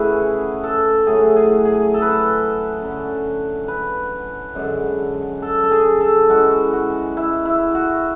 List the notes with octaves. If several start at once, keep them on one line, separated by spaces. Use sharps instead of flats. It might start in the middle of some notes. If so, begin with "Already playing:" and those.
Already playing: C#3 E3 A3 C#4 E4 F#4 G#4 B4
A4
A2 F#3 A3 G#4
G#4
G#4
A4
B4
A4
D3 F#3 C#4
B4
F#2 D3 G#3 D4
A4
A4
G#4
A4
E3 G#3 C#4 E4 F#4
F#4
E4
E4
F#4